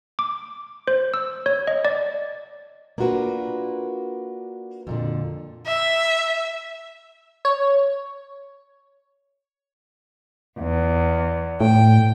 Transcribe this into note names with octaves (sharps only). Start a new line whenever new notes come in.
D6
C5
E6
C#5
D#5
D5
A#3 D4 F4 F#4 A#4 B4
F2 A#2 D3
E5
C#5
E2
A2 G5